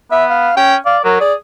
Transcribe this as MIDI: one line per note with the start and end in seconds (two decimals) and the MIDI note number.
0.11 0.51 59
0.11 0.25 76
0.30 0.54 77
0.57 0.76 61
0.57 0.76 79
0.86 1.04 74
0.86 0.98 77
1.05 1.18 54
1.05 1.19 70
1.20 1.34 68
1.20 1.33 74